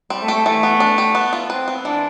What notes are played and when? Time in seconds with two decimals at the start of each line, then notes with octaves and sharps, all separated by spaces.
0.10 G3 C4
0.22 A3
0.28 G4
0.34 A3
0.46 E3 A3
0.63 B3
0.80 D4
0.98 G4
1.15 B3
1.33 F4
1.50 C4 B4
1.68 B3
1.85 E3 D4